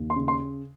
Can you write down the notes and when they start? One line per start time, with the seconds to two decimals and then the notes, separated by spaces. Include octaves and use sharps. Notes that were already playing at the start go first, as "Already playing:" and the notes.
Already playing: D#2
0.10 C6
0.16 C#3
0.28 C6